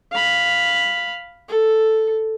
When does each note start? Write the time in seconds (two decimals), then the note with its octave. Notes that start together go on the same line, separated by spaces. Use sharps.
0.12 F5 B5
1.49 A4